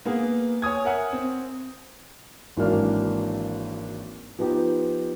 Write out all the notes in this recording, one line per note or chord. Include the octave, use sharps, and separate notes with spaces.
A#3 B3 G#4
C#5 G#5 D#6 G#6
A#4 E5 F#5 G#5
C4
G#1 E3 F#3 A#3 D4 F6
F3 B3 D#4 G4 B4